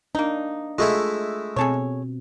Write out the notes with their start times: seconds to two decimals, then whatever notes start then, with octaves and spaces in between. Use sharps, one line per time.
0.15 A#3 D4 D#4
0.79 G#3 A3 E4 F4
1.56 B2 C4 G#4 A4 C#5